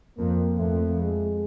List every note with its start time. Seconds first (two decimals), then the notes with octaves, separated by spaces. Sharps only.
0.18 F2 A#3
0.59 F2 A3
1.01 G#3